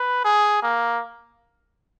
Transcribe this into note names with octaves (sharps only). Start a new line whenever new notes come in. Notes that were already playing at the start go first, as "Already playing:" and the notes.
Already playing: B4
G#4
A#3